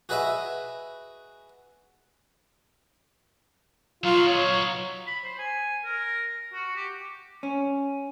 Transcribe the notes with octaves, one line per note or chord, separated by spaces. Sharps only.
F#4 G#4 B4 D#5 E5
F#3 D#4 F4
C#5
B5
C5
G#5
A#4
F#4
G4
C#4